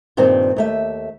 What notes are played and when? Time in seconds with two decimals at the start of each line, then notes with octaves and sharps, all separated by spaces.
0.17 G2 A#2 D#3 C4
0.57 D#2 A3 E5